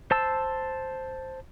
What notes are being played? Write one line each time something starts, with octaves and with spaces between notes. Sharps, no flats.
C5 A5 E6